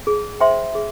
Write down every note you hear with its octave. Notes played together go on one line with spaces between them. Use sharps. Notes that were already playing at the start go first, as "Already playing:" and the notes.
G#4
C5 E5 G5 C6
G#4